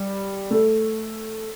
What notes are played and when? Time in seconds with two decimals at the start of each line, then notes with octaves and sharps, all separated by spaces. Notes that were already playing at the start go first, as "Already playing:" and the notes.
Already playing: G3
0.51 A3